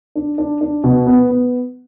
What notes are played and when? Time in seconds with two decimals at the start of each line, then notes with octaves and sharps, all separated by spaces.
0.15 D4
0.38 D4
0.61 D4
0.84 B2
1.06 B3
1.29 B3